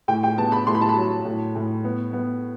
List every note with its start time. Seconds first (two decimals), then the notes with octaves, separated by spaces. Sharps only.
0.08 A2 G5
0.23 G5
0.37 B3 A5
0.52 B5
0.67 A2 C6
0.75 B5
0.81 A5
0.89 B5
0.97 F#3
1.25 A2
1.55 A2
1.84 B3
2.13 B3